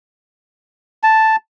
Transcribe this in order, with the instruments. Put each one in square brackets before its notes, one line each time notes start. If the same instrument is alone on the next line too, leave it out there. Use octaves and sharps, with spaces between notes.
[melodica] A5